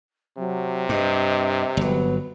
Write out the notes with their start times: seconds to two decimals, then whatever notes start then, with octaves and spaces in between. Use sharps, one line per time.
0.37 C3 F#3
0.89 G2 D#5
1.77 G1 F#3 B3